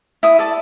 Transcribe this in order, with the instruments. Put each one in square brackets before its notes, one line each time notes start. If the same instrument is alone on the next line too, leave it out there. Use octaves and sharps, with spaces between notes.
[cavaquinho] E4 D#6
A4 D5